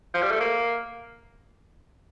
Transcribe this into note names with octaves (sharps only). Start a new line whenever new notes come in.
F3
G3
A3
A#3